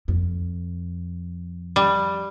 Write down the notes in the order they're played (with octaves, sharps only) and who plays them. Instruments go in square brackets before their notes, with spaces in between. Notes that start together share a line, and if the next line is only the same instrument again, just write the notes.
[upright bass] F2
[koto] G3